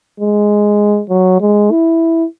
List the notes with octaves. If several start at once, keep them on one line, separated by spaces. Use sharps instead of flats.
G#3
F#3
G#3
E4